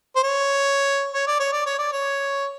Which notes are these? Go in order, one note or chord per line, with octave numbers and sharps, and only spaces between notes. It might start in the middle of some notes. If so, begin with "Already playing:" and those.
C5
C#5
C#5
D5
C#5
D5
C#5
D5
C#5